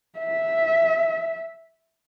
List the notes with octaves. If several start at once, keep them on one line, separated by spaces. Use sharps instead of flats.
E5